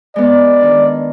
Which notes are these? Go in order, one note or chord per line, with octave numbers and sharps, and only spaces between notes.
G#3 B3 D5
D#3 D4